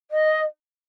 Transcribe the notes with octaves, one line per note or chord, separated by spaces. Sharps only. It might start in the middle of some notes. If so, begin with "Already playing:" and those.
D#5